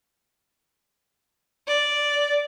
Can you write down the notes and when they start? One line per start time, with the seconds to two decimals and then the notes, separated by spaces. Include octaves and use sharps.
1.67 D5